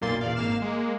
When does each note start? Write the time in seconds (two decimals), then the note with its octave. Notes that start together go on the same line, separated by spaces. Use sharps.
0.01 B1 F#2 A#2 A#3 C6 A6
0.21 E2 A#2 D5 F5
0.35 G#1 A#3 F5 F6 E7
0.62 G#3 A#3